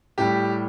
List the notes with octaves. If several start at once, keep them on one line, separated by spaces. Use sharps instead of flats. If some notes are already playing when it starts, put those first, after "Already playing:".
A2 G3 G4